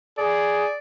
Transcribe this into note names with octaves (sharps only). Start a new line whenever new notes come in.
G#4 D5